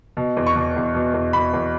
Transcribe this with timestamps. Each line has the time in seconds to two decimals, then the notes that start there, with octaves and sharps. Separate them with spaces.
0.17 B2
0.37 E2
0.47 C#6
0.56 B2
0.76 E2
0.95 B2
1.14 E2
1.33 B2 B5
1.53 E2